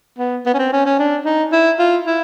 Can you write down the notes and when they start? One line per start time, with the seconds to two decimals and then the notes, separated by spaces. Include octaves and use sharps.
0.18 B3
0.46 B3
0.54 C#4
0.59 C4
0.73 C#4
0.86 C#4
0.99 D4
1.25 D#4
1.52 E4
1.79 F4
2.07 E4